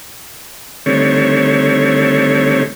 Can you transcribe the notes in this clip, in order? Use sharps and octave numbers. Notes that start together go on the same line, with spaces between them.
D3 D#3 G3 A3 C4 C#5